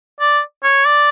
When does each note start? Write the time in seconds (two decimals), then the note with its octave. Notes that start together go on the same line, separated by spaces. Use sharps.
0.21 D5
0.64 C#5
0.86 D5